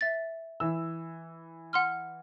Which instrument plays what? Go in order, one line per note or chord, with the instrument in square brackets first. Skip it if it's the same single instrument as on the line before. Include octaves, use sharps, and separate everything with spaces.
[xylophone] E5 A6
[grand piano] E3 E6
[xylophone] F#5 C6 F6